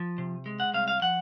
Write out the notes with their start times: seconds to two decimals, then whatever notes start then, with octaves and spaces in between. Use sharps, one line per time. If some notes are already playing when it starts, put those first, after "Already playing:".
Already playing: F3
0.18 C3
0.46 G#3
0.60 F#5
0.74 C2 F5
0.88 F5
1.02 F3 F#5